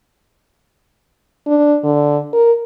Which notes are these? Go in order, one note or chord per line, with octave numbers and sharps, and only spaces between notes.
D4
D3
A#4